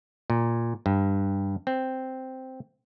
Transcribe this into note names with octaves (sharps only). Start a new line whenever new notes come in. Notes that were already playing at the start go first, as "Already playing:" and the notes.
A#2
G2
C4